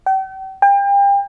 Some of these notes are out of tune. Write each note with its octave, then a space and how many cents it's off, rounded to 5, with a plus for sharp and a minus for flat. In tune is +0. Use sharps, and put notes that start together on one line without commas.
G5 -40
G5 +35